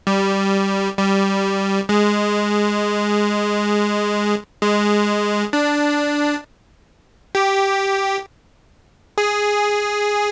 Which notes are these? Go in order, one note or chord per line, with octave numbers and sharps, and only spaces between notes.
G3
G3
G#3
G#3
D4
G4
G#4